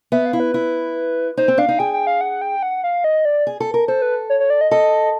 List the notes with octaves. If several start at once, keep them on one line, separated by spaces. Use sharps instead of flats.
B3 E5
F5
E4
B4
E4
D#4 C5
C4
D4 F5
D#4
G#4 G5
G5
F5
F#5
G5
F#5
F5
D#5
D5
G#4
A4
A#4
A4 C5
B4
C#5
C#5
D5
D#5
A4 D#5